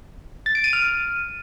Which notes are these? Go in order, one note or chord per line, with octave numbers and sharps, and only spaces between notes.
A6
D7
D#7
F6